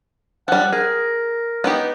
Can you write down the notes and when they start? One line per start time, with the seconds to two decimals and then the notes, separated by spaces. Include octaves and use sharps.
0.48 F3 G3 F#5
0.72 G#4 A#4
1.64 B3 D#4 G4